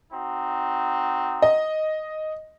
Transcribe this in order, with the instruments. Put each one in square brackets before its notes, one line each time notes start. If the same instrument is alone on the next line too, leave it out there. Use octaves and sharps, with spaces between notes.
[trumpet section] C4 D#4 F#4
[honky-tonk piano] D#5